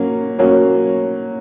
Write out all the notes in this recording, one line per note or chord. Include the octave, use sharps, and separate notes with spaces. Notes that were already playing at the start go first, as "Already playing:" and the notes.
Already playing: F#3 A#3 C#4
F#3 A#3 C#4